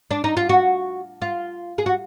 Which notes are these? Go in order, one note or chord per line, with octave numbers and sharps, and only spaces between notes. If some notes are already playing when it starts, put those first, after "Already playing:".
D4
D#4
F4
F#4
F4
G#4
F#4